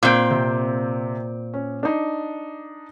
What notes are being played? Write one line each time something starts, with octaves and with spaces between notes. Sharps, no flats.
A#2 C4 D6 G6
C3
C#4
D4 D#4